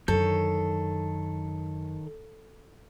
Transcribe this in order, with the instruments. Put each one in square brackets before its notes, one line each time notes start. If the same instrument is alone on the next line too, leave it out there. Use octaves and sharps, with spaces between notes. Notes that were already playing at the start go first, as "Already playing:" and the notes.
[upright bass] F#2 D3 [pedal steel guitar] D#3 C#5 G6 [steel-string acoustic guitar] A4